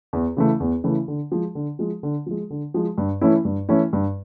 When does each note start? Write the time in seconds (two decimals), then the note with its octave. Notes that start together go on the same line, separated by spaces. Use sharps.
0.13 E2
0.37 C#3 E3 A3
0.60 E2
0.84 C#3 E3 A3
1.08 D3
1.32 F3 G#3
1.55 D3
1.79 F3 G#3
2.03 D3
2.26 F3 G#3
2.50 D3
2.74 F3 G#3
2.98 G2
3.21 E3 A3 C#4 E4
3.45 G2
3.69 E3 A3 C#4 E4
3.93 G2